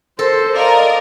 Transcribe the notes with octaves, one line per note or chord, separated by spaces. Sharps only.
A4 A#4 C5 C6
A#4 D5 D#5 F5